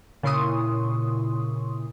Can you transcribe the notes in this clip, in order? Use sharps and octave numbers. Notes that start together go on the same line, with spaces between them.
A#2 C#3 E4 C6 C#6 D#6